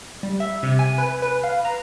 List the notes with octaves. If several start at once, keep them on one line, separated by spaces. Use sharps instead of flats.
G3
E5
C3
G#5
B4
B4
F5
A#5